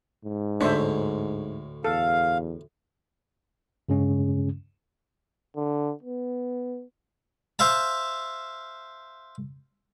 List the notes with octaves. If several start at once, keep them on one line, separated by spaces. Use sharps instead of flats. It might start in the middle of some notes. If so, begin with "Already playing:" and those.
G#2
D2 A2 D4 C5 C#5 E5
E2 A4 F5
G2 C#3 G#3 C#4
D3
B3
C5 E5 F5 A5